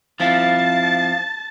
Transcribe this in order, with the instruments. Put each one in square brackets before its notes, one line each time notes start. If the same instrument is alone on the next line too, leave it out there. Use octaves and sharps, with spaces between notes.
[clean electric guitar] F3 C4 E4 [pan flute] F5 [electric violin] A5 A6